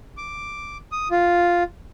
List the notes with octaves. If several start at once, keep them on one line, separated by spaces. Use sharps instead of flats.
D6
D#6
F4